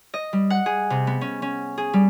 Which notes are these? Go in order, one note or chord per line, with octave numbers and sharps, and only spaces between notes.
D#5
G3
F#5
G#4
C3
B3
C#4
C#4
G#4
G3